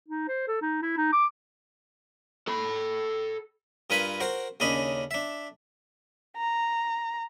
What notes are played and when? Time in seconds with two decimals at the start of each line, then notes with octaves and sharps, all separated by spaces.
0.08 D#4
0.28 C5
0.48 A4
0.61 D#4
0.82 E4
0.97 D#4
1.13 D6
2.47 A4 B5
3.90 G2 F4 A#4 B4 G#5 B5
4.20 F#4 A#4 C5
4.60 D#2 C#3 C#4 D4 D#5 B5
5.11 D4 E5
6.37 A#5